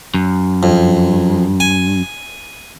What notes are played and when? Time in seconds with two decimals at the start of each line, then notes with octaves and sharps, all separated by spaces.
0.14 F#2
0.63 F2
1.60 G#5